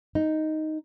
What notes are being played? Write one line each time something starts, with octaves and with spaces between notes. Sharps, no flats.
D#4